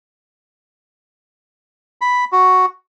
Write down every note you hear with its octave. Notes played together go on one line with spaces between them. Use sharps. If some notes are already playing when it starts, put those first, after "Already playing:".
B5
F#4